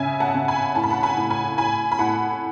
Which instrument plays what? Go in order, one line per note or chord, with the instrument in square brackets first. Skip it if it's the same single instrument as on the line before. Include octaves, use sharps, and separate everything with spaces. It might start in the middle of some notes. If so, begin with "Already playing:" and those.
Already playing: [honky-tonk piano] C#3 E5 G#5
F#5 A5
C#3
G#5 B5
A2 A5
B5
F#5 A5
G#5 B5
A2
G#5 B5
A2 G#5 B5
B5
A2 F#5 A5